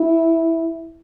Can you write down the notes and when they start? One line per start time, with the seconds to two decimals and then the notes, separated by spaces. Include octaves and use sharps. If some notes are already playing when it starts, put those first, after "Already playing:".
Already playing: E4